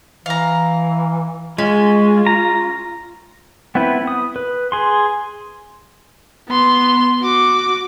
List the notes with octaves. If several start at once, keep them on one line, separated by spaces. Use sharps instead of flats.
E3 F5 A#5
G#3 C#4 F4
A#5
B3 C4 E4 B4
D#6
B4
G#4 C6
B3 C6
F#4 D6